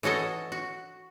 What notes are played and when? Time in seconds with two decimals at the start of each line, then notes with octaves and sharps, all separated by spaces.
0.03 E3 C#4 F#4 A4 D#5
0.52 F#4